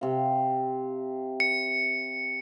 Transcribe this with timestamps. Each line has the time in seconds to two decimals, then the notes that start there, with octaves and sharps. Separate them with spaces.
0.01 C3 F5
1.40 C#7